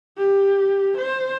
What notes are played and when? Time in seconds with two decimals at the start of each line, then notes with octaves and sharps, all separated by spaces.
0.17 G4
0.98 C5